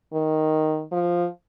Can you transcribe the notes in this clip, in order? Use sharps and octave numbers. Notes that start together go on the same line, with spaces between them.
D#3
F3